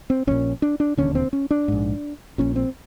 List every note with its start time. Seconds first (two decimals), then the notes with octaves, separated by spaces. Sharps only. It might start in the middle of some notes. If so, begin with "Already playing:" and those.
0.10 C4
0.27 A#1 A#2 C#4
0.62 D4
0.80 D4
0.97 E1 D#2 D3 C#4
1.15 C4
1.33 C#4
1.51 D4
1.68 A#1 G#2
2.38 A#1 A#2 C#4
2.56 C4